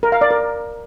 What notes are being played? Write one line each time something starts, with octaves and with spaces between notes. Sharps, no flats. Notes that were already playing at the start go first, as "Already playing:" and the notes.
A#4
F5
D5
A#4